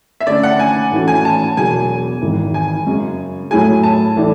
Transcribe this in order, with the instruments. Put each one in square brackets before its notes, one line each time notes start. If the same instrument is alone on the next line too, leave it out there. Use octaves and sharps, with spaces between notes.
[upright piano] E5
[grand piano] D3 A3 C#4 [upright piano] D5
[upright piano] F#5
G#5
[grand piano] A2 E3 A3 C#4 F#4
[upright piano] G#5
A5
[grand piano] E1 E2 B2 F#3 [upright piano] G#5
[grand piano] G#1 G#2 E3
[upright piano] G#5
[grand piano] F#2 C#3 G#3
[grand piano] A2 F#3 A3 E4 G#4 [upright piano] G#5
[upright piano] A5
[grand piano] A2 E3 A3 D4